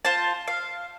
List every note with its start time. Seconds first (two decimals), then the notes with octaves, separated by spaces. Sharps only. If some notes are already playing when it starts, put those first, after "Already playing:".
0.05 F4 C5 A5
0.48 F5